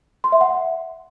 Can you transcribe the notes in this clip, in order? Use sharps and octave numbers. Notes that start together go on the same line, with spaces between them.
C6
E5
F#5